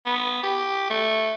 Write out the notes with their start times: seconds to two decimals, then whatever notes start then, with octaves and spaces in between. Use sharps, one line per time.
0.06 B3
0.43 G4
0.90 A3